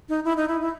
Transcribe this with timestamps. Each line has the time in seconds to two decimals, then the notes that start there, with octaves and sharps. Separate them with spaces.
0.09 D#4
0.25 E4
0.37 D#4
0.49 E4
0.61 E4